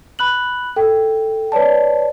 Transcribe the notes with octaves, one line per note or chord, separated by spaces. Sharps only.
B5 F#6 F#7
A4 G5
B4 C#5 D5 A5